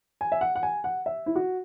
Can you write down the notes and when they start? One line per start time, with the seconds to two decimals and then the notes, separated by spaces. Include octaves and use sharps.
0.21 G#5
0.32 E5
0.41 F#5
0.55 F#5
0.63 G#5
0.84 F#5
1.06 E5
1.26 E4
1.35 F#4